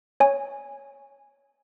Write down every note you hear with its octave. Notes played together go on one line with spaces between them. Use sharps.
C#5 G#5